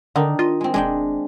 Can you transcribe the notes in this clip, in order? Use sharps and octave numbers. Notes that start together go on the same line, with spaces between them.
D3 D#3 D4 D#4
F4 D#5
G#3 C4
E1 G#3 D4 G5